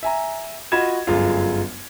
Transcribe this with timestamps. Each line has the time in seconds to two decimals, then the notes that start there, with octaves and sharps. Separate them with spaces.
0.03 E5 G#5 A#5
0.72 F4 F#4 D#5 B5 G#6 E7
1.07 G1 F#2 G#3 F4 F5